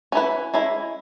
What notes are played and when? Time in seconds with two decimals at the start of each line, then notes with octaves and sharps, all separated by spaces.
0.12 C#4 E4 B4
0.54 G#3 C#4 E4